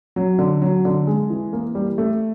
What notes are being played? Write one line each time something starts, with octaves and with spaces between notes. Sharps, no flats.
F#3
D3
F#3
D3
G#3
E3
A#3
G3
A3